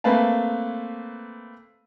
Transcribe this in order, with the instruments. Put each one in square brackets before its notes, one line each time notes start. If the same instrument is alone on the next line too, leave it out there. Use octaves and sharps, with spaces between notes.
[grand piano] A3 A#3 C4 B4 F5 A5